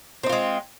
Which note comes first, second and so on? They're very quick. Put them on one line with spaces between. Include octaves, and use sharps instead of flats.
C4 D#4 F4 G#3